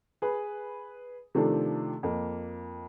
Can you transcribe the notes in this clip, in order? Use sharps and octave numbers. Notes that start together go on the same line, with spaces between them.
G#4 B4
C3 D#3 F3 A3 D4 A4
F2 A#3